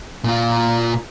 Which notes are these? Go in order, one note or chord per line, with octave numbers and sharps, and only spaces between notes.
A#2 F4